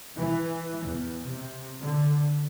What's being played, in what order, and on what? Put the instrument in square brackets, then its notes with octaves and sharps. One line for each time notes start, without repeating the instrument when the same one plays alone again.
[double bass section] E3
E2
C3
D3